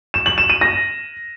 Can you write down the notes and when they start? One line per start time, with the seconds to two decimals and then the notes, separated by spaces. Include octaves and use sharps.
0.14 E7
0.26 F#7
0.38 E7
0.50 D#7
0.61 A#6